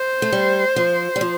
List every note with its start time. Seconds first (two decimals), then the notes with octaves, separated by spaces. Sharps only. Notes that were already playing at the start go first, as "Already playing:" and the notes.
Already playing: C5
0.22 A3
0.32 G3
0.76 F3
1.16 G3
1.21 F3